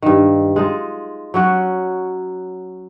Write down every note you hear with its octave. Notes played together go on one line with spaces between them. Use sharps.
G2 D#3
G#3 D#4 F4
F#3 C#4 F#4